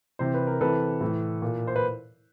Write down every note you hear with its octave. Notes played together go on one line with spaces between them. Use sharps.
C3 E3 C5
B4
A#4
C3 E3 A4 B4
A2 E3
A#2
C5
B4